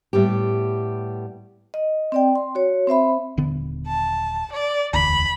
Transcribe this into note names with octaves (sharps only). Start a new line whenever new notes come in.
A2 G3 B3 G4
D#5
C4 D5 G5
C6
F#4 C#5
C4 C5 E5 B5
D#1 D3 B3
A5
D5
E1 D2 B5